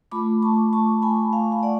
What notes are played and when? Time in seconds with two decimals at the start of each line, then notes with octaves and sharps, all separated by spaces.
0.11 A3 F4 B5 D6
0.42 A5 C#6
0.73 A5 C#6
1.02 G#5 B5
1.33 F5 G#5
1.52 F5
1.63 D5 F#5